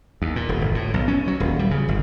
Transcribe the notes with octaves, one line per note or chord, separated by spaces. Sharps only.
D#2
A#2
D#1
G1
A2
B1
C#4
F#3
D#1
G3
C#3
G1